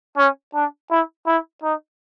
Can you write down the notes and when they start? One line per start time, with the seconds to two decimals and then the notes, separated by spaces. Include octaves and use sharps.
0.17 C#4
0.54 D4
0.90 E4
1.27 E4
1.63 D#4